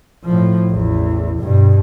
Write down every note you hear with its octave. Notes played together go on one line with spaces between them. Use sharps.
A2 F3
A1 E2
G2 B2